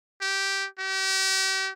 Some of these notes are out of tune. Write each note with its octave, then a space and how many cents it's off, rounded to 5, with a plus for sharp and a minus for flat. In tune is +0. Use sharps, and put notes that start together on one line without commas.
G4 -10
G4 -40